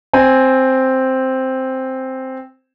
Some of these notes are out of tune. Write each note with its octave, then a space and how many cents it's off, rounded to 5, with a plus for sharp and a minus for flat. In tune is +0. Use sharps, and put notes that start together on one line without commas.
C4 +0 G#5 -10